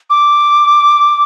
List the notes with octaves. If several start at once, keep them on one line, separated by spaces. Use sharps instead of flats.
D6